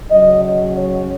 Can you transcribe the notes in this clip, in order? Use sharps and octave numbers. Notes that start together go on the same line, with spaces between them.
C#3 F#3 C#4 D#5
D#5
C#5